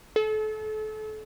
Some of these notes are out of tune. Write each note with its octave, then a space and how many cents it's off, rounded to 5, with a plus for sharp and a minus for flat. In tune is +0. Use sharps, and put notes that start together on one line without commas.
A4 -35